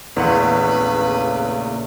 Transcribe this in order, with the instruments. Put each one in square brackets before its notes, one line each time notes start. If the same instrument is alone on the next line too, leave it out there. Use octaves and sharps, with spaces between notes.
[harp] A#1 F#5 C#6 [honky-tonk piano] E2 [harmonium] C#3 A3 A#3 [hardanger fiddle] B4